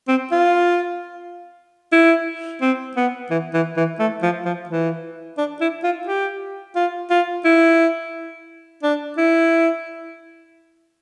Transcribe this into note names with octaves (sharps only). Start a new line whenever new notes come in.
C4
F4
E4
C4
B3
E3
E3
E3
A3
F3
F3
E3
D4
E4
F4
G4
F4
F4
E4
D4
E4